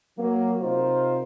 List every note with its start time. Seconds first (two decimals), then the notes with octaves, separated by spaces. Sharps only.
0.18 F#3 A#3
0.61 C3 D#4 F4 A#4 C5